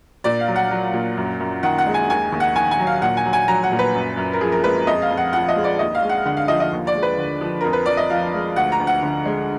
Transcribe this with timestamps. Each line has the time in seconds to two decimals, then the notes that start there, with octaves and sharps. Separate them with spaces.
0.24 A#2 D5
0.40 F5
0.48 F#3
0.56 F#5
0.71 F#3
0.93 A#2
1.17 F#2
1.40 F#2
1.63 D#3 F#5
1.78 F#5
1.86 G#3
1.94 G#5
2.10 D#2 G#5
2.32 D#2
2.40 F#5
2.55 D#3 G#5
2.71 G#5
2.79 F#3
2.87 F5
3.02 A#2 F#5
3.17 G#5
3.25 F#3
3.33 G#5
3.48 F#3 A#5
3.63 F#5
3.72 A#2
3.79 B4
3.95 F#2
4.17 F#2
4.33 A#4
4.40 F3 G#4
4.52 A#4
4.64 G#3 B4
4.87 F2 D#5
5.02 F5
5.10 F2
5.17 F#5
5.33 F3 F#5
5.48 D#5
5.56 G#3
5.64 D5
5.79 D#2 D#5
5.95 F5
6.02 G#3
6.09 F#5
6.26 D3 F#5
6.37 F5
6.48 F3 D#5
6.60 D#5
6.72 D#2
6.87 D5
6.95 G#3
7.03 B4
7.18 D3
7.41 F3
7.61 F2 A#4
7.73 B4
7.86 F2 D5
7.97 D#5
8.10 F3 F5
8.33 G#3
8.56 D2 F#5
8.72 A#5
8.80 D2
8.87 F#5
9.02 D3
9.25 G#3